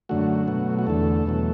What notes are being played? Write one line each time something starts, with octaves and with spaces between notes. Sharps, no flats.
F#2 D3 A3 F#4
B2 F#3 A3
F#4
E2 D3 A3 A4
E2 B2 F#3 A3